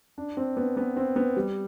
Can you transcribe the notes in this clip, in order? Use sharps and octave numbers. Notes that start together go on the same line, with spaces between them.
D4
C4
B3
B3
C4
B3
G3